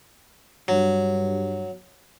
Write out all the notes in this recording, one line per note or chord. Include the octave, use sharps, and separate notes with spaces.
G2 F#3